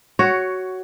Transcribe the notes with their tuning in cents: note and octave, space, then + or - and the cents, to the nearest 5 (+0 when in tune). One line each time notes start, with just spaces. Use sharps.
F#4 +10 C#5 +5